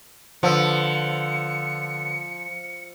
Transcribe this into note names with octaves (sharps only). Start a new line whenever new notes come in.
D3 F3 B4 E6 C#7